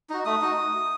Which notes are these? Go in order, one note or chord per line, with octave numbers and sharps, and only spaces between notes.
D#4 F#4
A3 D#6
D#4 F#4